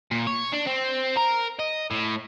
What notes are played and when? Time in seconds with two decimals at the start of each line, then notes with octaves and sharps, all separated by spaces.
0.11 A#2
0.27 C#5
0.53 D4
0.67 C4
1.17 A#4
1.59 D#5
1.91 A2